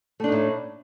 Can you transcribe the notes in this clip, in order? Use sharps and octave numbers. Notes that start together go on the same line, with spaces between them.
A2 A3 D4 D#4